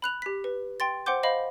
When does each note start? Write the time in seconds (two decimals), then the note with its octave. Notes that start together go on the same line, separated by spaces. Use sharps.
0.02 B5 F#6 F7
0.22 G4 B6
0.44 B4
0.80 G5 C6 A6
1.06 C5 F#5 G5 C6 D6 G6
1.23 C5 D#5 F5 B5